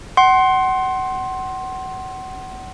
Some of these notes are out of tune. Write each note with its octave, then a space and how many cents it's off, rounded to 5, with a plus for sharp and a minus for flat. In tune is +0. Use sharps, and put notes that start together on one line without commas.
F#5 +30 C6 +15